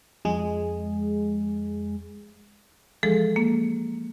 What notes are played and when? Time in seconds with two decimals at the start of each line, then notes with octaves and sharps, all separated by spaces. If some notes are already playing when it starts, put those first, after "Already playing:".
0.25 F2 G#3 G#4
3.03 E3 F3 G#3 G#4 A4
3.36 A#3